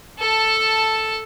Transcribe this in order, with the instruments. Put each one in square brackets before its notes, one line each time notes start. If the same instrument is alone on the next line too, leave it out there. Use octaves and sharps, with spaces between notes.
[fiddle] A4 A5